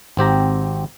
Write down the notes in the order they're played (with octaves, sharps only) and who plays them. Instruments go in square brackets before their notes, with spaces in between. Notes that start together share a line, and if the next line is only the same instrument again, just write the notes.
[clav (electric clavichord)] G#1 C4 G4 A#5